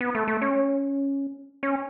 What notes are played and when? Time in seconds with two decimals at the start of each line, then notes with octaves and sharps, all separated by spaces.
0.01 B3
0.15 A3
0.28 A3
0.42 C#4
1.63 C#4